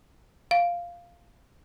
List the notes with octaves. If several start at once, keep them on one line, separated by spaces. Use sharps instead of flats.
F5